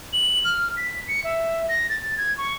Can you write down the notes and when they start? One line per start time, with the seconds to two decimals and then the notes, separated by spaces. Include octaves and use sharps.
0.13 F#7
0.45 F6
0.77 B6
1.08 C#7
1.24 E5
1.69 A#6
1.90 A6
2.18 G#6
2.38 C#6